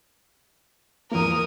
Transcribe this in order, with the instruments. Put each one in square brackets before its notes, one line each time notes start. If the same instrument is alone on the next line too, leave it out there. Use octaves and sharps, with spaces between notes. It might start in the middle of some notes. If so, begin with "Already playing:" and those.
[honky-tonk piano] E2 A#3 [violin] A#4 D#6